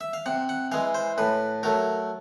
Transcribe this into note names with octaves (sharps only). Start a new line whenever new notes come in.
E5
F5
C3 F#5
F#5
E3 G#3 F5
C5
A2 B4
F#3 A3 A#4